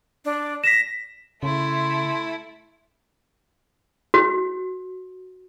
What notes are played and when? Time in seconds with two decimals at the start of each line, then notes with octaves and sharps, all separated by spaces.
0.25 D4
0.64 A#6 B6 E7
1.43 C#3 A3 E4 C6
4.14 F#4